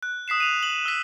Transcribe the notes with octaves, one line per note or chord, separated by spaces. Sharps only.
F#6
D#6 B6 C7 E7
D#7 F7
F#7
E6 B6